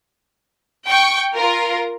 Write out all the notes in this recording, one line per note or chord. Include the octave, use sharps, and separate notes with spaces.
G5 C#6
F4 A#4